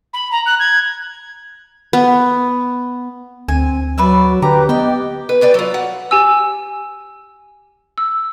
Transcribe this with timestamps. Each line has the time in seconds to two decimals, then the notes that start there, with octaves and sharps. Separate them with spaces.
0.13 B5
0.32 A#5
0.46 F#6
0.59 G#6
1.93 B3
3.48 D2 C4 G#5
3.98 F#3 B4 D5 E5
4.42 D3 G4 B4 A#5
4.69 B3 D5 D#5 G5
5.29 B4
5.41 G#4 B4 D5 G5
5.54 F#3 F4
5.74 F#5
6.11 G4 G#5 E6
7.98 E6